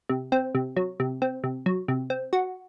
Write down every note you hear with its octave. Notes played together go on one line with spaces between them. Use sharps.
C3
C4
C3
F#3
C3
C4
C3
F#3
C3
C4
F#4